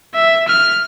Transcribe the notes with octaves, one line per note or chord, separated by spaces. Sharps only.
E5
F6